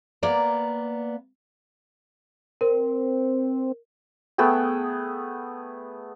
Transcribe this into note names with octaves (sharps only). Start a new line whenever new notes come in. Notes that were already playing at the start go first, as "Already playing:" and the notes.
A#3 B3 D5 A#5
C4 A#4
A3 B3 G#4 G5